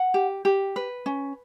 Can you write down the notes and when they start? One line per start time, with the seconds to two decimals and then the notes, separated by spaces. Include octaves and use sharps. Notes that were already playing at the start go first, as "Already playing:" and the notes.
Already playing: F#5
0.14 G4
0.45 G4
0.76 B4
1.06 C#4